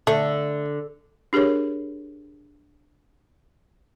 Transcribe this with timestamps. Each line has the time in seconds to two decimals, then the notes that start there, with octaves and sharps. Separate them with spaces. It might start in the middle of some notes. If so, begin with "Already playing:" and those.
0.07 D3 A3
1.33 D4 G4 G#4 A#4 C#5